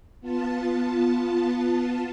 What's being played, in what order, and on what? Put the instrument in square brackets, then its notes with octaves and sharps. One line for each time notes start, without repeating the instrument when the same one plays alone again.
[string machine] B3 F4 A5